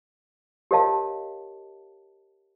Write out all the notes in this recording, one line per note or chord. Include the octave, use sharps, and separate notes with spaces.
G4 A#4 C#5 D#5 F5 A5